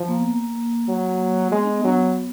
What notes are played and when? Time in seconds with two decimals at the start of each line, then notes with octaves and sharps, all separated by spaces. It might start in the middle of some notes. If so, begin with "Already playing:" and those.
Already playing: F3
0.08 A#3
0.18 B3
0.25 A#3
0.88 F#3
1.52 G#3 B3
1.64 D4
1.76 B3
1.84 F#3